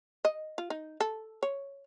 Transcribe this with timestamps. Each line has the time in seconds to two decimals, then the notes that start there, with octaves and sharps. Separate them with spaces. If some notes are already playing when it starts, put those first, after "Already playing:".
0.25 D#5
0.58 F4
0.70 D#4
1.01 A4
1.43 C#5